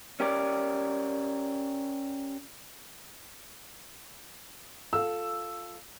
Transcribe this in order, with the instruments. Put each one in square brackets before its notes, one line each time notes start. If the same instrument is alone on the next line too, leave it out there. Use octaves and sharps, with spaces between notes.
[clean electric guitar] C#4 G4 A#4 D5
[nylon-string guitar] F4 A4 F5 [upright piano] E6